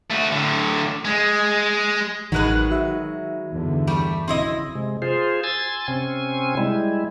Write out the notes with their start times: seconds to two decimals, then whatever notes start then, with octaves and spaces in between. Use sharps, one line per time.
0.11 A3 F#4
0.32 A2 D3
1.05 G#3
2.32 A1 D#3 F#3 G#3 B4 F#6
2.71 F#4 E5
3.50 E2 G2 D3
3.87 G3 A3
4.28 A#1 C#3 C4 E4 D#5
4.75 C3 G#3
5.02 F4 G#4 C5
5.44 G#5 C6 E6 G#6 A6
5.88 C3 C4 C#4 G#5
6.57 G3 G#3 E4